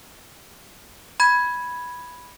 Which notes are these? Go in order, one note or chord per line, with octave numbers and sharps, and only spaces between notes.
B5 G#6